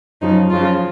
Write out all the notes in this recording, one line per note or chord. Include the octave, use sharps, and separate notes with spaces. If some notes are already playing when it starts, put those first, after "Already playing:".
F#2 C#3 F3 D#4
F#2 C#3 F3 F4